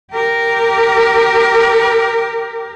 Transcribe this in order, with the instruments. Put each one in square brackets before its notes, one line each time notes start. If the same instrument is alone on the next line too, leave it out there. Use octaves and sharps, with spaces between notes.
[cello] G4 A#4